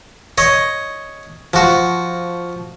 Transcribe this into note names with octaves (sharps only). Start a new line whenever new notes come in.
C#5 D#5
F3 F#4